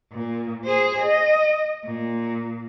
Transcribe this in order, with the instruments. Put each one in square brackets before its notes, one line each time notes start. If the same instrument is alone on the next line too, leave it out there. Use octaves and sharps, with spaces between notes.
[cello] A#2
G#4 C5
D#5
A#2